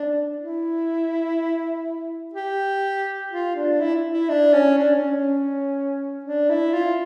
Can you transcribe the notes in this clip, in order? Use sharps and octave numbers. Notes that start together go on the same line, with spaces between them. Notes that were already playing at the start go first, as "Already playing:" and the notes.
Already playing: D4
E4
G4
F4
D4
E4
E4
D4
C#4
D4
C#4
C#4
D4
E4
F4